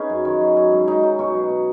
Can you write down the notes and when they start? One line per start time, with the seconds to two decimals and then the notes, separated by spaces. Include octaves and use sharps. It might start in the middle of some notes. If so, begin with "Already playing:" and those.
Already playing: C#4 D#4 G#4 B4
0.09 F#2
0.25 D#3
0.40 F#3
0.56 F#3
0.72 G#2
0.87 F#3 D#4
1.03 F#3
1.19 B2 F#4
1.34 F#3
1.50 B2